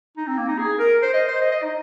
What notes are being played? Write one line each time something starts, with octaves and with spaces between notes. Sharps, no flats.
D#4
C4
A#3
D#4
G#4
A#4
C5
D#5
C5
D#5
D#5
D#4